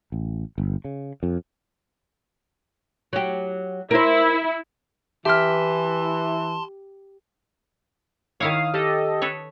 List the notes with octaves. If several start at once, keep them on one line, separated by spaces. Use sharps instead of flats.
A1
G1
C#3
F2
F#3 G4
E4 A#4 C5
E3 G4 E5 A5 C6 F6 B6
D#3 E4 C#5 F5 D#6
G4 A4 D#5 F5
A4 B4 C#5